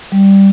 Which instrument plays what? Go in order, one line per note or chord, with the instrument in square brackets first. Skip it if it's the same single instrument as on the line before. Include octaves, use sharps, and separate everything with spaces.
[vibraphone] G3